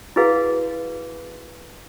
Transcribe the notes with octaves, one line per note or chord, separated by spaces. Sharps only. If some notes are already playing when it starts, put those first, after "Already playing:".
E4 F#4 G#4 B4 F5 F#5